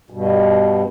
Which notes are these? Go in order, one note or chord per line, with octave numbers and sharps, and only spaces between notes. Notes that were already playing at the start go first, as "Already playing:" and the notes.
G2 B2